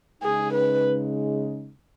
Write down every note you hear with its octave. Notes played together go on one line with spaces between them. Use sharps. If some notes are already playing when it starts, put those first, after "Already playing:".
C#3 G#3 D#4 G#4
B4